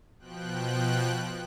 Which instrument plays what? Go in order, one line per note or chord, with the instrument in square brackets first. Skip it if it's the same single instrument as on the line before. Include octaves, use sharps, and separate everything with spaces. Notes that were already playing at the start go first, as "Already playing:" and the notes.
[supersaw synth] B2 F3 G5 F#6